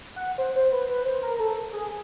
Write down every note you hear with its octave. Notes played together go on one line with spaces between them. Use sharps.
F#5
C5
C5
B4
B4
C5
A#4
A4
G#4